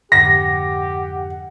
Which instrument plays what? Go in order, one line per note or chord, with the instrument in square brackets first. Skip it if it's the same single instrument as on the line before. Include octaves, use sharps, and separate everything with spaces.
[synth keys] F2 G#2 D3 [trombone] G4 [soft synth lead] F#5 [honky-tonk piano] A#6